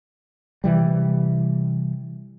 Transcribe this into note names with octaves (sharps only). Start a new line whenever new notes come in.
C3 E3 G3